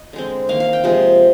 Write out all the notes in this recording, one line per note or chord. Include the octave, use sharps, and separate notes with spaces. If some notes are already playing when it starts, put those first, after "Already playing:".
Already playing: D#5
D3 G#3 C4
D#3 A#3 F5
F5
G5
C3 F3 G#3